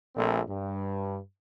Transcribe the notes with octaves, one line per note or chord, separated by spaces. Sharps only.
A#1 A#2 A3 C4 A4
G2